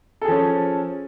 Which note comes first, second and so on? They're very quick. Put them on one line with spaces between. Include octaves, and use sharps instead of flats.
A4 G#4 F3 C#4